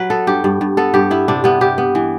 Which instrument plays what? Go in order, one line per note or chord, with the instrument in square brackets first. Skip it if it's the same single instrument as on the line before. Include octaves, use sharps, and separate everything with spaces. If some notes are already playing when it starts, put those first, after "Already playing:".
Already playing: [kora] F#3 B4
B3 A4
G2 G4
G2
G2
B3 A4
G2 G4
B3 E4
C3 D4
C3 B3
C3 G4
B3
E3